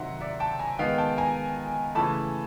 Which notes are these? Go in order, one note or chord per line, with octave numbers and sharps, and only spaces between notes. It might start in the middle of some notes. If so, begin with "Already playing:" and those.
Already playing: C3 D#3 F#3 E5 F#5 A#5 C6
D5 E5
G5 A5
G#5 A#5
D#3 G#3 B3 F5 G5
G5 A5
G#5 A#5
C#3 E3 A3 A5 B5